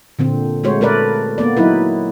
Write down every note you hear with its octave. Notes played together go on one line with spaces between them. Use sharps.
A#2 D3 C4
G#3 A3 F#4 C5 C#5
A3 A#4 B4 D5
A#3 B3 D5
F#3 D#4 E4 B4